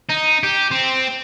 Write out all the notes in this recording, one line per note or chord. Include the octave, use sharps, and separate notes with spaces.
D#4
G4
C4